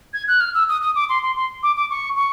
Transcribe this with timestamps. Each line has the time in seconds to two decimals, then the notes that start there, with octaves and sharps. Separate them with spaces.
0.14 G#6
0.28 F#6
0.41 F6
0.54 E6
0.69 D#6
0.82 D#6
0.95 D6
1.09 C6
1.23 C6
1.36 C6
1.63 D6
1.76 D6
1.90 C#6
2.16 C#6